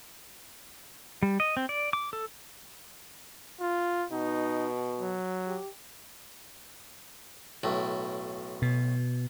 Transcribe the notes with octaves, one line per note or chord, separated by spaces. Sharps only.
G3
D#5
C4
D5
D6
A4
F4
B2 D#4
F#3
G4
B1 A2
B2